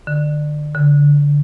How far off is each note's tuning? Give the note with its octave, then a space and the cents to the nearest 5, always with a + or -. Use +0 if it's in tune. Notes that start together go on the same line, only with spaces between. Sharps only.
D3 +25
D3 -20